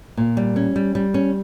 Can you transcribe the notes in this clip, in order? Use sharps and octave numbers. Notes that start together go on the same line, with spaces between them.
A#2
G3
C#4
G3
G3
C#4